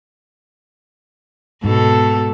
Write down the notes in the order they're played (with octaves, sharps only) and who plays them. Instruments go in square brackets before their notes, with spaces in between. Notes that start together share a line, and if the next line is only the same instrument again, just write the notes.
[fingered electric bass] G#2 [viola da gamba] B2 A4